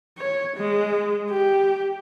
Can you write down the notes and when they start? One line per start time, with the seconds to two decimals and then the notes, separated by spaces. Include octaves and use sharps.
0.18 C#5
0.56 G#3
1.29 G4